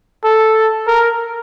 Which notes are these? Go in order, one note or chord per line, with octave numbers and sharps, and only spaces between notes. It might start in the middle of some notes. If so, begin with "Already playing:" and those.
A4
A#4